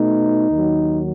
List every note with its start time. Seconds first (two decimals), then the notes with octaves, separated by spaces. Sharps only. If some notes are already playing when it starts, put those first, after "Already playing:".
Already playing: B2 A3 D#4
0.48 D#2 D#3 F#3